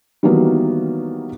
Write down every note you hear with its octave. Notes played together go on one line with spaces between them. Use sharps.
D#3 E3 F#3 G3 A#3 B3